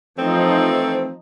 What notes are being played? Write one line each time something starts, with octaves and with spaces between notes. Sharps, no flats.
E3 F3 A3 C4 D#4